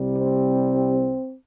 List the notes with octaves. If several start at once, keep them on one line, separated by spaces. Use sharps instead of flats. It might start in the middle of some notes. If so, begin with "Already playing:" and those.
Already playing: C2 C3 G3
C4